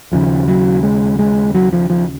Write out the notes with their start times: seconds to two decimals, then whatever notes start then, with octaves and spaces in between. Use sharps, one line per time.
0.12 D#2 C#3 F3
0.48 F#3
0.83 G#3
1.19 G#3
1.54 F#3
1.73 F3
1.90 F3